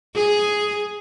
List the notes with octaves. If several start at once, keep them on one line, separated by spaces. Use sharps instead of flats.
G#4